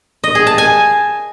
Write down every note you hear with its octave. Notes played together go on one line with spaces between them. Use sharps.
D#5
G#4
A5
G#5